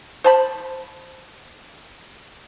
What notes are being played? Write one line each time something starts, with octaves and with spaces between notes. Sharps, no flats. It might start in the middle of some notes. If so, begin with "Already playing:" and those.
C5 A5 B5